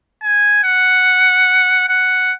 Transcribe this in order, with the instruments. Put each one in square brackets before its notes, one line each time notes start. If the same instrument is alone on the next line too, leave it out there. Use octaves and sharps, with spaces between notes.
[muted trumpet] G#5
F#5
F#5